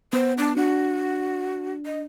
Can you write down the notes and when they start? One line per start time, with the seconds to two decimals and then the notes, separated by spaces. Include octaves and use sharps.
0.13 B3 C5
0.38 D4
0.57 D4 F#4
1.86 D#5